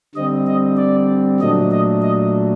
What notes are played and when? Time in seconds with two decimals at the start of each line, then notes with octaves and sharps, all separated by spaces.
0.15 D3 G3 C4 D#5
0.47 D#5
0.77 D5
1.40 A#2 F#3 A3 D4 D#5
1.71 D#5
2.02 D#5